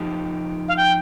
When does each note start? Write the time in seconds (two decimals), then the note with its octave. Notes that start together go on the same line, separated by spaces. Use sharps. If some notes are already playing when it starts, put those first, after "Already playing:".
Already playing: F3 D#4 G4
0.68 F5
0.77 G5